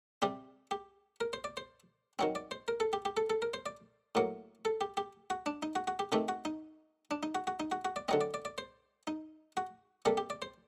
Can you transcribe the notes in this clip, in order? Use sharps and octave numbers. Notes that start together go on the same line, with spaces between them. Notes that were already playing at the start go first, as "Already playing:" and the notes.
C3 G3 C4 G4
G4
A#4
C5
D5
C5
D#3 F#3 C4
D5
C5
A#4
A4
G4
G4
A4
A4
A#4
C5
D5
A2 F#3 A#3
A4
G4
G4
F#4
D4
D#4
F#4
F#4
G4
C3 D#3 A3 C4 G4
F#4
D#4
D4
D#4
F#4
F#4
D#4
F#4
F#4
D5
D3 F#3 C4 D#5
D5
D5
D5
C5
D#4
F#4
C3 G3 A#3 A4
G4
D5
C5